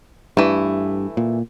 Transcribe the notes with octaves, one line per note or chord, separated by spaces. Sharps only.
G2 E3 A3
A#2